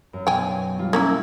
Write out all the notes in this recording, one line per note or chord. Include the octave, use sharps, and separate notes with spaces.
F#2
B2 F#3 G5 G#5
G3 F4
A#3 C#4 E4